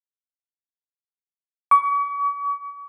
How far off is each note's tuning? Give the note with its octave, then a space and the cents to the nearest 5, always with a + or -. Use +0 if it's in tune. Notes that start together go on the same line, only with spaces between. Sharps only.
C#6 +40